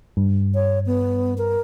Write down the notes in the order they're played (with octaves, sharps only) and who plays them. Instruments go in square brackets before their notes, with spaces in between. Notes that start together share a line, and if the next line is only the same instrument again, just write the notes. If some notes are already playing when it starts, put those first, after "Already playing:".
[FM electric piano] G2
[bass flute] C#5
B3
A#4